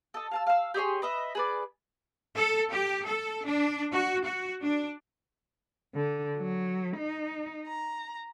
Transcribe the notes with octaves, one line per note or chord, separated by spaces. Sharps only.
A4 D#5
F5 A5 E6
F5 E6
G4 G#4 C#5 C6
B4 D#5 E5
G#4 B4 D5
A4
G4
A4
D4
F#4
F#4
D4
D3
F#3
D#4
A#5